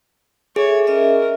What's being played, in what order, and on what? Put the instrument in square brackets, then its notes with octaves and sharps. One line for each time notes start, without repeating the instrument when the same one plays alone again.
[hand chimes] G#4 [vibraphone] A4 E5 [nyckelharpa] C#5
[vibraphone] C#4 D#5 E5 [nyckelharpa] A#4